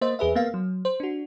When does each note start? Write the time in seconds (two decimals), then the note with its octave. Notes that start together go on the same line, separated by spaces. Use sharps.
0.01 A#3 C5 D#5
0.19 E2 G#4 B4 E5
0.35 A#3 B3 F5
0.54 F#3
0.85 C5
1.00 D4 F#4